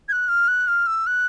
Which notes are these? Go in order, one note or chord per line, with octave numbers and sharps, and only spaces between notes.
G#6
F#6
F6
F#6
F6
E6
F#6